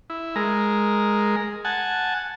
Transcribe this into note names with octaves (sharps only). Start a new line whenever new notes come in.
E4
G#3 A#4
F#5 G#5 A5